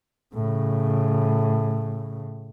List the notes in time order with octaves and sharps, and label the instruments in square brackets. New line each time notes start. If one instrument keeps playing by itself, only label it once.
[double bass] A2 C#3